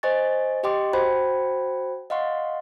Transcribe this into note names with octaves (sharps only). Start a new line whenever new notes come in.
C5 D#5 G#5 C#6 A6
G4 D#5 G5 C6 D6
F#4 C5 G5 A5 B5 G#6
D#5 F5 F#5 C6 C#6